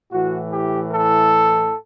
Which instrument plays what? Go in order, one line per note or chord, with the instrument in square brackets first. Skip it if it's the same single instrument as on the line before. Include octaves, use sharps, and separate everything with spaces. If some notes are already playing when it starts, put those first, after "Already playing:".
[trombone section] A2 E3 F#4
G4
A4